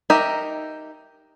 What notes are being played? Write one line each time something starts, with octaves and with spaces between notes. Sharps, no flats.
D#4 G4 A#4 E5